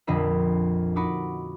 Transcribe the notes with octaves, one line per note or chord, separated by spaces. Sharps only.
A#1 F2 D3 D4 D#5 B5
D#4 F#4 B5 D6